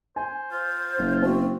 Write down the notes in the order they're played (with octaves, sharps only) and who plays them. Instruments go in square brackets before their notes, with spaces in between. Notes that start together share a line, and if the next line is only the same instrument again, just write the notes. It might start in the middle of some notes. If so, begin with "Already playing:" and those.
[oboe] C5 [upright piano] G#5
[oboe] F4 [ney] C5
[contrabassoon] F#1
[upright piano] C4 [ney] F#4